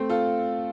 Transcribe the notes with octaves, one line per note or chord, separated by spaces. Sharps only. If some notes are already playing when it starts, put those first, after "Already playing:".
Already playing: A3 C4
F4 A4